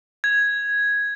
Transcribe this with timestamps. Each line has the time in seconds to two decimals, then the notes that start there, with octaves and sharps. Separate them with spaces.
0.24 G#6